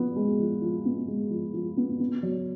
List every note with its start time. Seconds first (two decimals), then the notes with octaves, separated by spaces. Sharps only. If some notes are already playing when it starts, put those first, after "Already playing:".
Already playing: F3 B3
0.16 G#3
0.39 F3
0.62 F3
0.85 B3
1.08 G#3
1.30 F3
1.54 F3
1.77 B3
2.00 B3
2.23 F#3